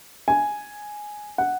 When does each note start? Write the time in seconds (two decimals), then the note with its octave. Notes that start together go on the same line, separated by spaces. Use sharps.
0.28 G#5
1.38 F#5